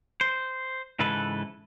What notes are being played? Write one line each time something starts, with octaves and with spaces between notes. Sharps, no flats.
C5
G#2 C#3 E3 A4 B4